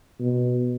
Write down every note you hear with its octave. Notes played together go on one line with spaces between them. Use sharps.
B2